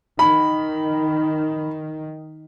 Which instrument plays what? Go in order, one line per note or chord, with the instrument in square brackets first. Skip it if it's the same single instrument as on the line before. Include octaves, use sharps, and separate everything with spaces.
[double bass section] D#3 [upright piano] B5